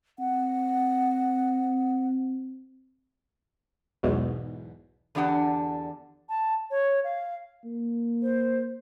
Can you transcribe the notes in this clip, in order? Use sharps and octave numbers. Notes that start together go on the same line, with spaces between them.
C4 F#5
B1 E2 G#2 B2
E2 D3 D4 G4 F#5 A5
A5
C#5
F5
A#3
C5